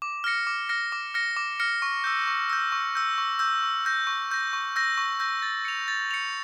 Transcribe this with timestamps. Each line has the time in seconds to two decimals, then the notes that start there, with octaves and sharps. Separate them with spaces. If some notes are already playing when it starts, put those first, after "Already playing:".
0.02 D6
0.24 F6 A#6 C#7
0.47 D6
0.69 F6 A#6 C#7
0.92 D6
1.14 F6 A#6 C#7
1.37 D6
1.60 F6 A#6 C#7
1.82 C#6
2.04 E6 G6
2.27 C#6
2.50 E6 G6
2.72 C#6
2.95 E6 G6
3.18 C#6
3.39 E6 G6
3.63 C#6
3.85 E6 G6 A#6
4.07 C#6
4.31 E6 G6 A#6
4.53 C#6
4.76 E6 G6 A#6
4.97 C#6
5.20 E6 G6 A#6
5.42 A6
5.65 C#7 F7
5.88 A6
6.11 C#7 F7